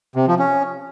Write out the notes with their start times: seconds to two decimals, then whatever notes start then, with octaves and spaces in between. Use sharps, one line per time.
0.16 C3
0.27 F3
0.39 C#4